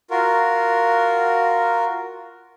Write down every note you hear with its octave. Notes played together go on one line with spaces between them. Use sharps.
F4 F#4 A#4